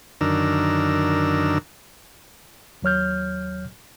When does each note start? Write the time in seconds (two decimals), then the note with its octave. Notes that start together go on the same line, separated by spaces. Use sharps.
0.21 F#2 D3 D#3 D4 A#4 E6
2.82 D#2 F#3 C#5 F6 G6